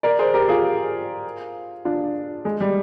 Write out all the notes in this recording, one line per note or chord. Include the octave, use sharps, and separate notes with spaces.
A#4 D5
G#4 C5
G4 A#4
F4 G#4
D4 F4
G#3
G3